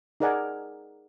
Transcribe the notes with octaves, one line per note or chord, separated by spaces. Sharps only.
D#4 G#4 A#4 D5 F#5 G#5